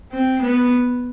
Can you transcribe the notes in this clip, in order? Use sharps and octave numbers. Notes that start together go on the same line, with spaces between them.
C4
B3